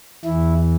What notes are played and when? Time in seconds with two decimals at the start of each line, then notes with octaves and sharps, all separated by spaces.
0.24 E2 E3 E4